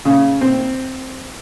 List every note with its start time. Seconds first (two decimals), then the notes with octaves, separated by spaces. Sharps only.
0.05 C#3
0.41 C4